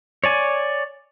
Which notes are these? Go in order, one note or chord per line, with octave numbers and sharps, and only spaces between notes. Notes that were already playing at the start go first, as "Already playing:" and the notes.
C#5 D5 G#5